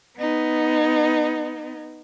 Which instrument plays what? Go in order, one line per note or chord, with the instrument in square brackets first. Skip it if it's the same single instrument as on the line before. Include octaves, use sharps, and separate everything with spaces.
[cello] B3 D#4